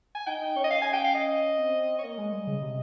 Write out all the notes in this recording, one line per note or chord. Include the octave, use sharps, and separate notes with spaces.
G#5
D#4 G5
D#4
C#4 C#5
D#5
F5
G#5
G5
F5
D#5
C4
C#5
A#3 D#5
G#3
G3
C#3
C3